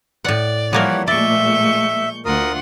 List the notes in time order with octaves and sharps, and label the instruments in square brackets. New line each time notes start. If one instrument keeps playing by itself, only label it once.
[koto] A2 F#5 [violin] D5
[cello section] E3 G3 [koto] F3 A#3 A#4 [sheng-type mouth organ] C#5 F#5
[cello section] A#2 G#3 A3 [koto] D5 [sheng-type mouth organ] E5 [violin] C#6 G6
[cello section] D2 [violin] F4 F#5 [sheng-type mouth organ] A#4 D#6